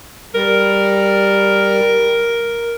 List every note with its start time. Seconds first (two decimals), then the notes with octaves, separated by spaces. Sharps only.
0.35 G3 A#4